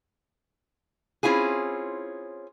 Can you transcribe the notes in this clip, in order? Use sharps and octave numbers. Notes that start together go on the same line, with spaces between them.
C4 C#4 E4 F4 G#4